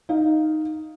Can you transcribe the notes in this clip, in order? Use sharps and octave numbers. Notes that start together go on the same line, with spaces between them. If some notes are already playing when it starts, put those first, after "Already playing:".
D#4 F5